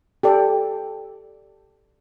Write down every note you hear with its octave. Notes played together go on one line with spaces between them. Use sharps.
G4 A4 D5